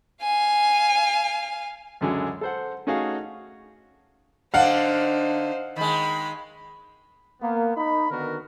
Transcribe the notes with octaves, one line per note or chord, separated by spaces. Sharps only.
F5 G#5
C#2 F#2 D3 F#3 G#3
A4 C5 F#5
A3 C#4 D#4 F#4 G#4 F5
D3 D4 D#4 C5 F5 F#5
D#3 G#3 B5
A#3 B3
D#4 B5
D3 D#3 B3 F#4 A#4